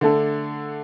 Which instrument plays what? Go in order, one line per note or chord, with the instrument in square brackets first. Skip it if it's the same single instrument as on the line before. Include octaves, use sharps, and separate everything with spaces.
[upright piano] D3 A3 D4 A4